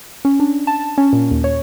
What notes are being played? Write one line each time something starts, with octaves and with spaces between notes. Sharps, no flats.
C#4
D4
A5
C#4
A#2
D#2
C#5